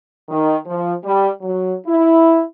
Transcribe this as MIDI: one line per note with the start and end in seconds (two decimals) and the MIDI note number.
0.29 0.55 51
0.65 0.92 53
1.04 1.28 55
1.41 1.73 54
1.86 2.42 64